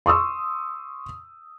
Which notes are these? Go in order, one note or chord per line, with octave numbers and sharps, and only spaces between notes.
C6 C#6 D#6 E6